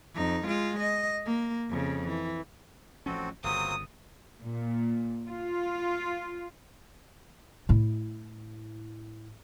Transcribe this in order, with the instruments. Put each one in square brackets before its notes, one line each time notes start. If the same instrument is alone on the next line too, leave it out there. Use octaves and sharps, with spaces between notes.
[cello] F2 D#4
G#3 F4
D#5
A#3
F2 C#3
E3
[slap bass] A1 F3 C#4 [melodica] C4 F#4 A4
[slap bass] G1 C#3 [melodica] F#3 A#3 C4 [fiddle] D#6
[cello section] A#2
F4
[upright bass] A2 E4